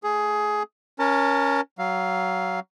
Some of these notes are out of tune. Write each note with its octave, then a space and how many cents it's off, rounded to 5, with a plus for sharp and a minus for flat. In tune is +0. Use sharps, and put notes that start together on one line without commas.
A3 -5 G#4 +15
C#4 +5 A#4 +25 A5 +35
F#3 +20 F5 +0